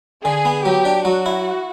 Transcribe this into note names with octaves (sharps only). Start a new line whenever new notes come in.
D3 G#4
B3
F#3 G4
D4
F#3 F#4
E4